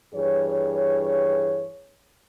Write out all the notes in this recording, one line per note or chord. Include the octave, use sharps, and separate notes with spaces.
G2 E3 G#4 C#5